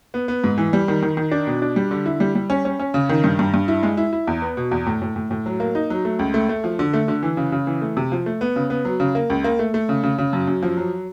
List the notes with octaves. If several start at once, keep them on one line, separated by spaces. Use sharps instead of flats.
B3
B3
G#2
E3
G3
D#3
D#3
D#3
D4
B2
D4
G3
D3
E4
G3
G3
C#4
C#4
C#4
C#3
D#3
G2
G2
G2
E4
G#3
E4
E4
E2
B3
B2
E2
A2
A2
A2
A2
F#3
A#3
D#4
F#3
A3
C#2
A3
A3
F3
D3
A3
D3
E3
C#3
C#3
E3
A3
C3
F3
A3
B3
C#3
B3
F#3
C#3
A#3
C#2
A#3
A3
A3
C#3
C#3
C#3
F#2
F#2
F3
F#3